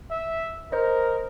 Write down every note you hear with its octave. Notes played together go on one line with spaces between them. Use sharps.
E5
A#4 C5 D#5